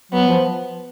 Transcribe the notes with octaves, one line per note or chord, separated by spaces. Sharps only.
F#3 B3
F3